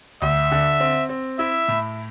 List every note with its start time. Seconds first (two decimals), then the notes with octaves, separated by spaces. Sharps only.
0.22 D2 E5
0.52 D3
0.80 C4
1.09 C4
1.39 E4 E5
1.68 A2